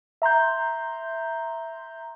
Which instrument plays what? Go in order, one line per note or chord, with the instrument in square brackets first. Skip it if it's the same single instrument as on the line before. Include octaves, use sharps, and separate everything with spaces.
[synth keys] E5 A#5 C6 G6